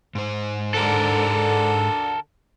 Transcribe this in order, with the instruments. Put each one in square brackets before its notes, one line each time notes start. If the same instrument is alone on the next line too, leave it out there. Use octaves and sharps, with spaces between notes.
[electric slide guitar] G#2 C5
[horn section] D3 [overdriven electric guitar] A4 A#4